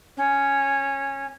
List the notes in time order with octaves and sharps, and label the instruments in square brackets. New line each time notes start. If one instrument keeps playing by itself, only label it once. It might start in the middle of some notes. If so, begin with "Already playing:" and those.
[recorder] C#4